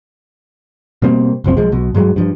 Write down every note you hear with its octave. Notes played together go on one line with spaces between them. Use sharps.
B2 G3 A#3 C4
F#1 C2 F3 C4
B1 F3 G#3
B1 B2
G2 F#3 G#3
G2 F3